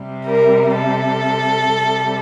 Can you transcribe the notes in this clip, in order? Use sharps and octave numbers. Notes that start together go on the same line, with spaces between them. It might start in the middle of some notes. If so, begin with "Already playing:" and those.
Already playing: C3 G3
A#4
A4
C3 G3